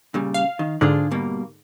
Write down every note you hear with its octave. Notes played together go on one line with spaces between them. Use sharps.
A#2 C#3 G3
F5
D#3
G#2 D3 D4 F4 G#4
B2 G3 A#3